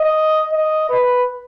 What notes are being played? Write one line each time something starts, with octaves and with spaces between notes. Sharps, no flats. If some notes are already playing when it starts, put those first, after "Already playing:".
Already playing: D#5
D#5
B4